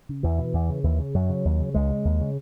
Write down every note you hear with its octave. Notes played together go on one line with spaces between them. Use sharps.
C#3
E2 E3
B2
E2
C#3
D#2 E3
C#3
F#2 F#3
C#3
D#2
C#3
C#2 G#3
C#3
D#2
C#3